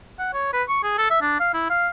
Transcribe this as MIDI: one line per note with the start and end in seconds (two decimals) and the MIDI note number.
0.19 0.33 78
0.33 0.53 73
0.53 0.63 71
0.69 0.80 85
0.83 0.97 68
0.98 1.06 69
1.10 1.19 76
1.21 1.39 62
1.40 1.50 77
1.54 1.67 64
1.70 1.89 77